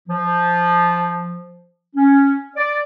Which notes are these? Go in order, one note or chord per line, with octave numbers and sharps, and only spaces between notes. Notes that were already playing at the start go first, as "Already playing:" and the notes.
F3
C#4
D5